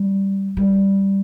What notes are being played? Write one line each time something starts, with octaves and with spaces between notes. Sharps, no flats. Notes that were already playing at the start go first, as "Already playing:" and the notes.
Already playing: G3
G3